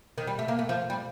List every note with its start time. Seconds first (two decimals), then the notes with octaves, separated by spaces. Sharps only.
0.18 D#3
0.27 G3
0.39 A3
0.48 A#3
0.59 A3
0.69 F3
0.90 G3